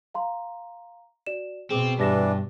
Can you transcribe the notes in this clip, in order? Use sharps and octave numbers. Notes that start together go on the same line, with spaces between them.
F5 A#5 C6
F#4 D5 E7
B2 C4 G#4 D6
G2 E3 D4 G4 A#6 E7